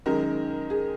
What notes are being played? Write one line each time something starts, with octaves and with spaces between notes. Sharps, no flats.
F#2 D#3 G#3 A#4
G#4